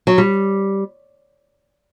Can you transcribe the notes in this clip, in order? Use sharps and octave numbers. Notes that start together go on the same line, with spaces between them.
F#3
G3